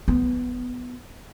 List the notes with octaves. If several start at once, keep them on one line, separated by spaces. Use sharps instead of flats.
B3